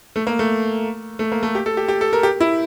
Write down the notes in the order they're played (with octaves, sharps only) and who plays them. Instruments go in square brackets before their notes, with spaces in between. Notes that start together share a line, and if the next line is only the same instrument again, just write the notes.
[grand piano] A3
A#3
A3
A3
A#3
A3
G4
A4
G4
G4
A4
A#4
G4
E4